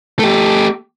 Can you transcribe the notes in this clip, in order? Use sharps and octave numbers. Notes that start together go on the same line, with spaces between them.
A3 G4